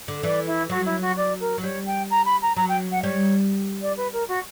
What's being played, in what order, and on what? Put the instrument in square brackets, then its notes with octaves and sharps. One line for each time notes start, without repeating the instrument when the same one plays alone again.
[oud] D3
[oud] E3 [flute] D5
[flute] E4
[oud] F#3 [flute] F#4
[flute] E4
F#4
D5
A#4
[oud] F#3
[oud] G3 [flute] C#5
[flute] G5
A#5
B5
A#5
[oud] F#3 [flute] A#5
[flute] G5
F#5
[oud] G3 [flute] C#5
[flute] D5
B4
A#4
F#4